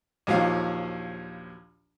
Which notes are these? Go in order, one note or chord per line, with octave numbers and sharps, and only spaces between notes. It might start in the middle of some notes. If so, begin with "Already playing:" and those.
A#1 D#2 F3 F#3 F5